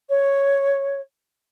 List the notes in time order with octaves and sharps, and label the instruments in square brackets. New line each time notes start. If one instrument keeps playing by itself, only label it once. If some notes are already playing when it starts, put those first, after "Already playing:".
[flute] C#5